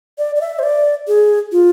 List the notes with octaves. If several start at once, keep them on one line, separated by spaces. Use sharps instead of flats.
D5
D5
E5
C5
D5
G#4
F4